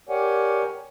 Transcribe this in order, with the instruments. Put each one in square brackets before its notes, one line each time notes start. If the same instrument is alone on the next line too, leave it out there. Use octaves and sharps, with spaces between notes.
[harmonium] G4 A#4 C#5 D5 F#5 G#5